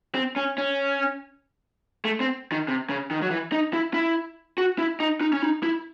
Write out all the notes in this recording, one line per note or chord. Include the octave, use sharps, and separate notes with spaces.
C4
C#4
C#4
A3
C4
D#3
C3
C#3
D#3
F#3
E3
D#4
E4
E4
F#4
E4
D#4
D#4
C#4
D#4
E4